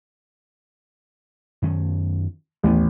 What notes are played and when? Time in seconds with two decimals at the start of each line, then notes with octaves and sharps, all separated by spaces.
1.62 F#2 D#3 C#4
2.64 A1 D#2 A3 B3